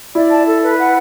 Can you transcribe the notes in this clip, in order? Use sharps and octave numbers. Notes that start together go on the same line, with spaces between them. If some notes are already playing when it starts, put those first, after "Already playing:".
E4 D5
A5
A4
B4
F#5